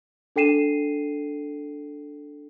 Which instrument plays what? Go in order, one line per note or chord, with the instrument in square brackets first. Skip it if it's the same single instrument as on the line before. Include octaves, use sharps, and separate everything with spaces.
[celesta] D4 A4 G5 C7 D#7 E7